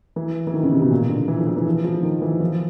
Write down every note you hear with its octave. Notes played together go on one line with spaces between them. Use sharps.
E3
E3
D#3
C#3
C3
B2
A#2
D3
E3
F3
E3
E3
F3
F3
D#3
E3
F3